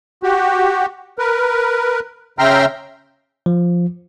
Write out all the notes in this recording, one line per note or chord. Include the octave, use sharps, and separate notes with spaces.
F#4 G4
A#4 B4
C#3 E5 G5 A#5 C6 F6
F3